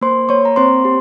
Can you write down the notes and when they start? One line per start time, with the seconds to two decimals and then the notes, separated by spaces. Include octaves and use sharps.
0.01 A#3 C5 C6
0.29 A#3 C#5 C#6
0.45 A#5
0.56 C4 C5 C6
0.85 G4